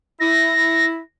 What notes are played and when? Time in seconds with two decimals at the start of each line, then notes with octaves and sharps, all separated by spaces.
0.20 E4 A#6